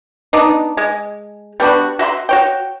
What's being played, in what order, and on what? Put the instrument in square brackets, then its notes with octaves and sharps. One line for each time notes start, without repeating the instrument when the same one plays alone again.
[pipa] B3 D4 D#4
G#3
G3 B3 D4 F#4
F#4 E5 B5 C6
F#4 C#5 G5